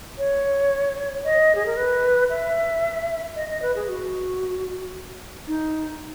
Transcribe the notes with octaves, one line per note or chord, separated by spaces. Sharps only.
C#5
D#5
G#4
A#4
B4
E5
D#5
D#5
B4
G#4
F#4
D#4